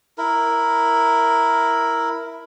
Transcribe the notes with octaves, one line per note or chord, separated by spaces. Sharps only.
E4 A#4